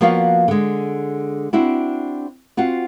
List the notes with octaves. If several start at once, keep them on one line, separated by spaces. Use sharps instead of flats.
F3 A#3 B3 F#4 D5 F5
D3 G#3
C4 D4 E4 F#4
C4 F4 F#4 F#5